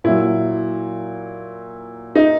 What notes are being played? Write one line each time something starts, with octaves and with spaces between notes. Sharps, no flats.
A#2 F#3 E4
D#4